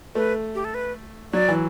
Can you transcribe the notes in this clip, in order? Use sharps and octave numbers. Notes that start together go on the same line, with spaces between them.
A3 B4
G4
A4
B4
F#3 D5
E3